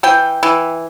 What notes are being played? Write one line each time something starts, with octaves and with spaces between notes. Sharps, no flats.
E3 G5
E3